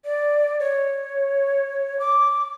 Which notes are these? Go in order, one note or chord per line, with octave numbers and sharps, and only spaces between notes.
D5
C#5
D6